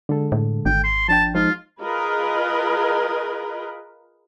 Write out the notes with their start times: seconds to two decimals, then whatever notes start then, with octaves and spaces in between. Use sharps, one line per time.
0.09 D3 G#3 A4
0.32 A2
0.66 G#1 G5
0.84 C6
1.08 F3 D4 G5 A5
1.35 F3 G#3 D#4 F4
1.80 F4 G#4 A#4 B4 D#5